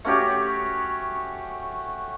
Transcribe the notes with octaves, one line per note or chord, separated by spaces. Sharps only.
A3 C#4 F#4 G4